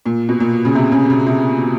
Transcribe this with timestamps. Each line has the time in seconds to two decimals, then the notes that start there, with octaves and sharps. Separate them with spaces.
0.06 A#2
0.29 B2
0.40 A#2
0.65 C#3
0.75 C3
0.92 C#3
1.10 C#3
1.27 C3